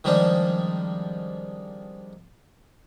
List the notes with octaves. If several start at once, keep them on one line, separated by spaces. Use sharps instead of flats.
D#3 F3 G3 G#3 C4 D4